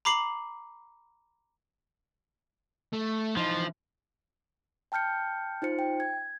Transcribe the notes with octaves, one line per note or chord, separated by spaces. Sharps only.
A#5 B5 D6 C7 F#7
A3
E3 F3 D#4
G5 A5 F6 G6 C#7
D#4 F4 C5 C#7
G5
G#6